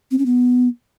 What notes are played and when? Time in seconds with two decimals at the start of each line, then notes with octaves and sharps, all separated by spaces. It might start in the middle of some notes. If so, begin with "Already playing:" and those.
0.11 C4
0.19 C#4
0.26 B3